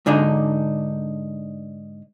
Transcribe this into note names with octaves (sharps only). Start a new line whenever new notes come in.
G#2 D3 D4 D#4